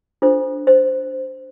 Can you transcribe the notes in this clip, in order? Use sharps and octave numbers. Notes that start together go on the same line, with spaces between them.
D4 F4 A4 C5
C5